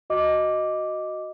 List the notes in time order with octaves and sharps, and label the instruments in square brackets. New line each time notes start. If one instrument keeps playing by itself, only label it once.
[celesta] F#4 D#5 D6